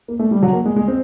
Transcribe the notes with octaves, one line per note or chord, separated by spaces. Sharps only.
A#3
A3
G3
F#3
A#3
G#3
G#3
C4